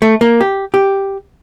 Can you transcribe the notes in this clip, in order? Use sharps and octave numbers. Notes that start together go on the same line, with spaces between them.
A3
A#3
G4
G4